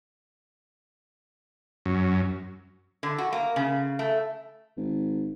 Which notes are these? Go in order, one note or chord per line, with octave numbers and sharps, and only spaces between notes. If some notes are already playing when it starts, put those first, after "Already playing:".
F#2
D3
F#4
A#3
C#3
A3
G#1